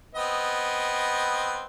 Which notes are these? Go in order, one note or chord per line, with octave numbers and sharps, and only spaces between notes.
B3 C4 D#5